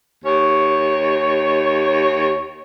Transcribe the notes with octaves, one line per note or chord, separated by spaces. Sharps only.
D#2 C#5